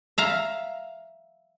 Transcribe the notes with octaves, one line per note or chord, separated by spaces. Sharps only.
E5 F5 A#5